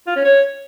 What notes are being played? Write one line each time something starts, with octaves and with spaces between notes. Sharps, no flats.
F4
C#4
C#5